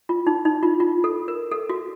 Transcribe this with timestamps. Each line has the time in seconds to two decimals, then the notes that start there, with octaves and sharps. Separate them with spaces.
0.09 F4
0.27 D#4
0.45 D#4
0.63 F4
0.80 F4
1.04 A4
1.28 A#4
1.52 A4
1.69 F#4